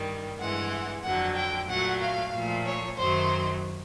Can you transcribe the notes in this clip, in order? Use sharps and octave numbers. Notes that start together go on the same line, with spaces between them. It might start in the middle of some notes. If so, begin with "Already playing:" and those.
Already playing: G2 D#3 G3
G2 E3 G#3 F#5
F2 D3 F#3 F#5
G5
A#2 F#3 A3 F#5
F5
A#2 F3 A3
C#5
F#2 D#3 F#3 A3 C5